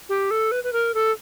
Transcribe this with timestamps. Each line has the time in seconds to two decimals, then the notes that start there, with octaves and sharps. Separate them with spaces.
0.09 G4
0.31 A4
0.52 B4
0.64 B4
0.73 A#4
0.94 A4